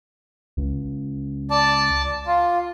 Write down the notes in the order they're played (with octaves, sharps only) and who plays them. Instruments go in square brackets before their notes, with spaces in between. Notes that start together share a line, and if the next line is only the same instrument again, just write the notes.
[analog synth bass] C#2
[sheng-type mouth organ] D5 A5
F4